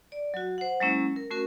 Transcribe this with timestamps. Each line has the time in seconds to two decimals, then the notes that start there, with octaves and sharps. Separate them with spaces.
0.12 D5
0.34 F#3 F#4
0.58 C5 F#5
0.80 F#3 G#3 A#3 C#4 E4
1.16 A#4
1.31 A3 C#4 F#4 A#4